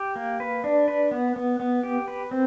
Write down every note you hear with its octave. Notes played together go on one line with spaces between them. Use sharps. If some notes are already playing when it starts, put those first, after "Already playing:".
Already playing: G4
A#3
B4
D4
B4
B3
B3
B3
G4
B4
C4